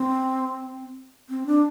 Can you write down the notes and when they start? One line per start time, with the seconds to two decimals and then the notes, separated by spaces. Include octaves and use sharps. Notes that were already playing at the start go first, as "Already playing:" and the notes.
Already playing: C4
1.30 C4
1.46 D4